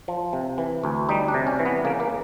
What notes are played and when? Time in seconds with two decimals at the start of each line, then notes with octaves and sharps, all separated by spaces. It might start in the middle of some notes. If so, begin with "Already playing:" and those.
0.08 F3
0.33 C3
0.58 E3
0.84 D2
1.09 G3 D#4
1.28 D4
1.34 C3
1.47 C#4
1.59 E3
1.65 B3
1.85 C#3 A#3
2.00 A#3